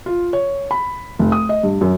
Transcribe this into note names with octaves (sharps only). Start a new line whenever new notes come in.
F4
C#5
B5
F1
D#6
D#5
G2
F#2